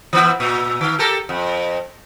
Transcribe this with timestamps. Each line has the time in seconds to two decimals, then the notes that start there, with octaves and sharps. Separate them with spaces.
0.13 E3 B3 E4
0.40 A#2
0.81 D#3
0.99 G4 A4 A#4
1.29 F2